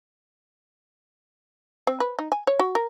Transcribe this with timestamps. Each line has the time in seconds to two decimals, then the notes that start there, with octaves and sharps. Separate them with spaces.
1.87 C4
2.00 B4
2.19 D#4
2.32 G#5
2.47 C#5
2.59 F#4
2.75 A#4